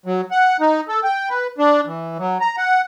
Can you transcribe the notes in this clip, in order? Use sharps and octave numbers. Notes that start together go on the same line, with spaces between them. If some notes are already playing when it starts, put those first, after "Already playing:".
F#3
F#5
D#4
A4
G5
B4
D4
E3
F#3
A#5
F#5